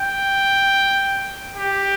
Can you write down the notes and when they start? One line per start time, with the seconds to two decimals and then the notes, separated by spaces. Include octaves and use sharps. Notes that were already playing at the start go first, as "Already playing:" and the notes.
Already playing: G5
1.56 G4